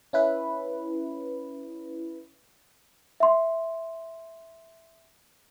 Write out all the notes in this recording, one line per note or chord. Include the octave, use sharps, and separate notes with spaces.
C#4 E4 B4
E5 C6